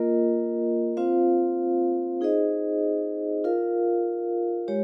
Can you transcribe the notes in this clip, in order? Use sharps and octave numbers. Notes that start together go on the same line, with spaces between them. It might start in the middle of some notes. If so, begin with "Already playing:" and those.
Already playing: A#3 F4 A#4 D#5
C4 F4 C5 F5
D#4 G#4 C5 D#5
F4 A#4 F5
G#3 G4 C#5